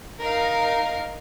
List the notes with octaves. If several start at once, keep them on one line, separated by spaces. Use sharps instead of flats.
D#4 A#4 F5